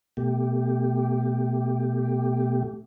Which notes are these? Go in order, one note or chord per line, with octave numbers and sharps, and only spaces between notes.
B2 A3 G4